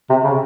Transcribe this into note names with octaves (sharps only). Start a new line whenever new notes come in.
C3
C#3